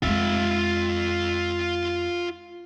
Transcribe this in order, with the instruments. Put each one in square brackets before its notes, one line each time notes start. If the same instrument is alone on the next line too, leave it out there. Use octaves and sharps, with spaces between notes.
[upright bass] F2 G#3 [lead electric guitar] F4 E5